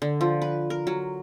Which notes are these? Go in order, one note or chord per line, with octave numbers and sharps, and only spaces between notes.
D3
F3
B4
A#4
F#3